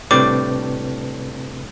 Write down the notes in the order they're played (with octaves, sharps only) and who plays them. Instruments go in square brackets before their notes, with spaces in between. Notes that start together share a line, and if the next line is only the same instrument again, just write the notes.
[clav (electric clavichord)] A2 G3 D4 [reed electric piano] C3 C4 B4 [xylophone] D6